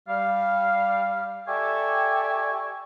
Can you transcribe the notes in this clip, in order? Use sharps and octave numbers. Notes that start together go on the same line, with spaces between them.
G3 F5
G4 A4 D5 E5 G#5 C#6